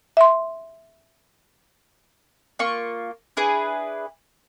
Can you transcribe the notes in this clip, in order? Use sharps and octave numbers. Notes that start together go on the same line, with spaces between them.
E5 C6
A#3 F4 C#6
D4 E4 G#4 B4